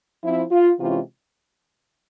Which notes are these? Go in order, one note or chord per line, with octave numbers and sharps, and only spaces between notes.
F3 C4 E4
F4
C3 E3 G#3 C#4 F4